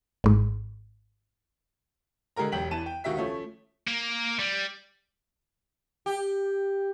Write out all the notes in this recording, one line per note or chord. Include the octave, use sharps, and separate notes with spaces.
G#1 G#2
D3 G#3 G4 A#4 A#5
E1 G4 G5 B6 F#7
E2 E3 A5 D#7 E7
G5
C#2 D#3 F#4 G4 E5 B6
F3 A3 C#4
A#3
G3
G4